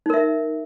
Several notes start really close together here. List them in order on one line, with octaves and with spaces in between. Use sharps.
D#4 A#4 E5